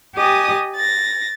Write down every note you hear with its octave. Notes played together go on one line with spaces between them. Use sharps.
G4 D#5 G#5 D#6
A6 A#6